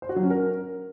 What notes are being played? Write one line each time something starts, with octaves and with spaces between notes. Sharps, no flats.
C5
F#4
F#3
C#4
A#4